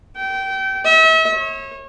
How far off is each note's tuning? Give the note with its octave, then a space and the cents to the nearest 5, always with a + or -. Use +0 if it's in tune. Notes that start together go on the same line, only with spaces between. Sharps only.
G5 -25
E5 -40
C#5 -30